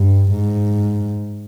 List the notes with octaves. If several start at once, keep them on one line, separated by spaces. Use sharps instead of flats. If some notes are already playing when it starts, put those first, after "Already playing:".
Already playing: G2
G#2